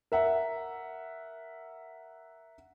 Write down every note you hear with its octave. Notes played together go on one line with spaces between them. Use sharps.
A#4 E5 F#5